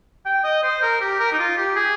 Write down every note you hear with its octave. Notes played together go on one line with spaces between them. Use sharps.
G5
D#5
C5
A#4
G4
A#4
D#4
F4
G4
G#4